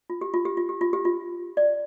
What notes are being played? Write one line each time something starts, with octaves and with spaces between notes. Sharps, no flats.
F4
G4
F4
G4
F4
G4
F4
G4
F4
D5